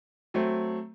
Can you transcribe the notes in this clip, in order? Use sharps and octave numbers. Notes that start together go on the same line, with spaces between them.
F#3 A3 C4